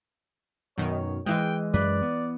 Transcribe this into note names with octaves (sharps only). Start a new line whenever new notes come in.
F#2 B2 D#3 C#5
E3 G#3 D#5 G5
F#2 B4 D5
B3